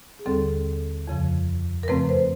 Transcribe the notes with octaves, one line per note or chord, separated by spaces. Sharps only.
G#4
D#2 D3 G3 C4 A4
F2 C#3 F3
A#4
F#2 C#3 F3 A3 C4 B4
C5